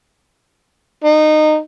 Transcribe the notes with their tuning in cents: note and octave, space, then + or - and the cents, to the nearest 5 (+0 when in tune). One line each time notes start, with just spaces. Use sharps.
D#4 -20